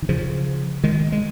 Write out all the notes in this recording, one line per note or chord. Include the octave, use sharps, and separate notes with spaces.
D#3
C#3 F3
D#3 G#3
G#3